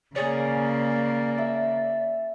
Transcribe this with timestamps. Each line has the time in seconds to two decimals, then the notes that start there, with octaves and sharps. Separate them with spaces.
0.16 C#3 A#3 C#4 G#4 D5
1.38 E5